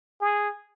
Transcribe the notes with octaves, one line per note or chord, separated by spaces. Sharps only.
G#4